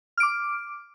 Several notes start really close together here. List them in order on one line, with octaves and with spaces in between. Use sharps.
F6 D7 D6